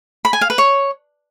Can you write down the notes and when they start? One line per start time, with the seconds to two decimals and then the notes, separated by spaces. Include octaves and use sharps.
0.25 B5
0.33 G#5
0.41 F5
0.50 B4
0.58 C#5